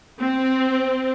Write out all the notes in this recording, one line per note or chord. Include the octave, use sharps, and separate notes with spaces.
C4